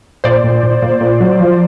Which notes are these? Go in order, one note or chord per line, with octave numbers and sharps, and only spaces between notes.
A#2 C5 D5
A#2
A#2
A#2
A#2
F#3
F3